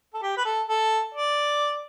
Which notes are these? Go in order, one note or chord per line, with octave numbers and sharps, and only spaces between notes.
A4
G4
B4
A4
A4
D5